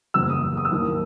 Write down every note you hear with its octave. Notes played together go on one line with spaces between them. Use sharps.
F#1 E2 C#3 F#3 E6
D#6
D#6
E6
D#2 D#3 F#3 D#6